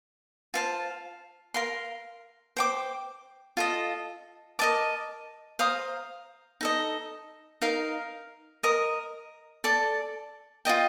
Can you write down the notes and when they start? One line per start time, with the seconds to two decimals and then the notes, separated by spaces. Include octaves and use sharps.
0.54 F4 C5 F5 A5
1.54 A#4 F5 C6
2.57 C5 G5 D6
3.57 F4 A4 D#5
4.59 A#4 D#5 A5 D6
5.59 C5 F5 A#5 D#6
6.61 D#4 A4 D#5
7.62 D#4 A#4 F5
8.63 A#4 D#5 A#5 D#6
9.64 A4 D5 A5
10.65 F4 A4 D#5 G5